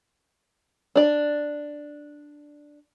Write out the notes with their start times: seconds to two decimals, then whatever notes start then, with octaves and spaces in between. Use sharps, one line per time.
0.95 D4 D5